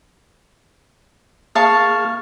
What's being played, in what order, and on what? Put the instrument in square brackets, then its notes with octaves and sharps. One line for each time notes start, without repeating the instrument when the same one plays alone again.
[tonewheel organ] A#3 G#4 F6 [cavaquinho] F5 A5 C#6